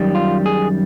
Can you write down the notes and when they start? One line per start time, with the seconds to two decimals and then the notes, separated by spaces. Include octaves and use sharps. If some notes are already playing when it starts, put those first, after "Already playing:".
Already playing: F#2 D#3 G3
0.15 F4
0.46 G#4